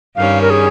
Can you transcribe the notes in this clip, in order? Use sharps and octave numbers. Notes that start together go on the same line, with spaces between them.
G2 D#3 G3 C#4 F5
A#4
G#4